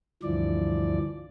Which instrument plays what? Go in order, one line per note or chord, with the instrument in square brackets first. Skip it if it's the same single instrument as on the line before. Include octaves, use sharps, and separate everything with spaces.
[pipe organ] D2 G2 E3 F3 D5